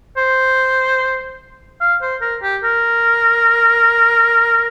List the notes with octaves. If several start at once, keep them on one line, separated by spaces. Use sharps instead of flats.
C5
F5
C5
A#4
G4
A#4